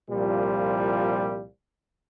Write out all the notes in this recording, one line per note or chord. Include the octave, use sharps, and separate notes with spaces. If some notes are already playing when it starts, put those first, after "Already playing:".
C2 A#2 F3 G3